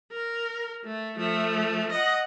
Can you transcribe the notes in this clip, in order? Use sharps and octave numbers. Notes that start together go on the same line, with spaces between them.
A#4
A3
F3 A3
D#5 F#5